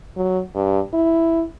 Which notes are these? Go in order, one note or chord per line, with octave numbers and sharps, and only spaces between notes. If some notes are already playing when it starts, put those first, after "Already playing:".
F#3
G2
E4